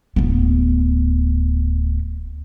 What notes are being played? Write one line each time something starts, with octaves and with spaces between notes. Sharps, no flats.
D1 B3